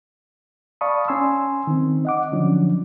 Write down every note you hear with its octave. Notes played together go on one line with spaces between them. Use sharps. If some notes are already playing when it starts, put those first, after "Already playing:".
D5 F5 A5 B5 C#6 D#6
C#4 G#5 C6 E6
D#3 C4
D#5 F#5 D6
D3 F3 F#3 C#4 D4